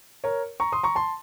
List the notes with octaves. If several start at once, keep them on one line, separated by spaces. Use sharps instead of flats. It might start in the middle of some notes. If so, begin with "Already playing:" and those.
A#4 C#5
A#5 C#6
C6 D#6
A#5 C#6
A5 C6